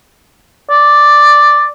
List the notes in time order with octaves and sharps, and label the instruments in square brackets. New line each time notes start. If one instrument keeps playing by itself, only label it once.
[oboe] D5